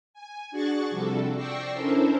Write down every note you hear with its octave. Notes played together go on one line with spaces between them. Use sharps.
G#5
D4 F#4 G#4 C#6 F#6 A6
C3 F3 G3 D4 F#4 A4
D5 G5 C#6 E6 A#6 C7
C#4 D4 E4 A4 A#4 C5